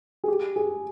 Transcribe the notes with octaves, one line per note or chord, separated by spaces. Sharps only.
G#4
G4
G#4